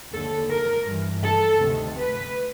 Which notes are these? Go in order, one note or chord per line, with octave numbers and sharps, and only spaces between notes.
D#2 D3 A4
A#4
G2 E3
A4
D2 C3 D#3
B4